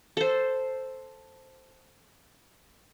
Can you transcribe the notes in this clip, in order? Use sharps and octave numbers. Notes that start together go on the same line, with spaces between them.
A4 C5